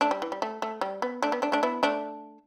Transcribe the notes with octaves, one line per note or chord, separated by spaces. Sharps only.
A3 D4
G3
E3
G3
A3
A3
G3
B3
A3 D4
B3
A3 D4
A3 D4
B3 E4
A3 D4